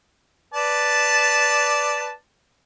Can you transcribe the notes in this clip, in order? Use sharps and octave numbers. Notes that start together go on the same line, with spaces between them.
B4 D5 A5